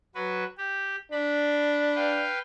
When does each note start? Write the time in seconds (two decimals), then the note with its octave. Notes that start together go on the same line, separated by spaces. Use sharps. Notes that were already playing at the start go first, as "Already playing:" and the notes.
0.15 F#3 F#4 B4
0.57 G4
1.12 D4 B5
1.95 B4 F5 G5